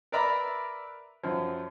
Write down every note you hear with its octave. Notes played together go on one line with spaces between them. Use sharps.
A#4 B4 D5 E5 A#5 B5
F#2 F3